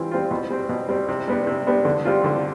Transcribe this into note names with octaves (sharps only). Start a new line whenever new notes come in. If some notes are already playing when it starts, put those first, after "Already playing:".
Already playing: E3 G3 C4 F4
G3 C4 F4
B2
G3 C4
B2
G3 C4
C3
G3 B3 D4
C3
G3 B3 D4
D3
G3 C4 F4
D3